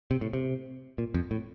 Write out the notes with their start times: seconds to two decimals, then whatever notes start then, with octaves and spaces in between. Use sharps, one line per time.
0.11 C3
0.21 A2
0.33 C3
0.98 A#2
1.14 F2
1.31 A2